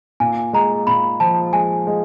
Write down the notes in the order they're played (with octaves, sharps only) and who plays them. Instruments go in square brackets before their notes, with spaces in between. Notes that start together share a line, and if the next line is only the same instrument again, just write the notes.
[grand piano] A#2 [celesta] G#5
[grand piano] G#3 [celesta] A#5
[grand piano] A#2 [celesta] B5
[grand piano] F3 [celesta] A5
[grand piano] G#3 [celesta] G#5
[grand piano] G#3